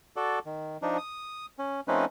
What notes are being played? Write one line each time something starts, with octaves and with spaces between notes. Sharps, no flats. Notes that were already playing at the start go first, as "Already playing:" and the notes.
F#4 A4 D5
D#3
F3 D4 D#4
D#6
C#4
F3 A3 C4 C#4 D#4 B4